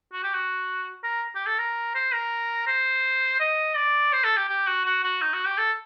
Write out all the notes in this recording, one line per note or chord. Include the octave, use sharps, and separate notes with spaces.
F#4
G4
F#4
A#4
G4
A4
A#4
C5
A#4
C5
D#5
D5
C5
A4
G4
G4
F#4
F#4
F#4
D#4
F#4
G4
A4